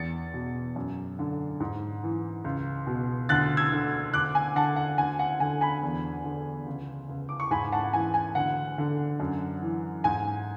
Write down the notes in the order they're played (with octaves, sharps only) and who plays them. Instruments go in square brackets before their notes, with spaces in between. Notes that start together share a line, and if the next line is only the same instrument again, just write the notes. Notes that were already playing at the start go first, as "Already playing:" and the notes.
Already playing: [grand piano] E2 A6 C#7
B2
F#2
D3
G#2
E3
C#2
B2
D2 F#6 A6
E6 G#6
D3
D2 D6 F#6
G#5
D3 F#5 A5
F#5
D2 G#5
F#5
D3 G#5
G#5 B5
E2
D3
C#2
C#2
D6
C#6
G#2 G#5 B5
F#5 A5
E3 G#5
G#5
D2 F#5
D3
F#2
E3
G#2 G#5